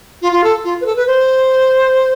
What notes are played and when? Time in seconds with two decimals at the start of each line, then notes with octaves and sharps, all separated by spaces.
0.22 F4
0.32 F4
0.44 A4
0.64 F4
0.81 B4
0.86 A4
0.96 B4
1.07 C5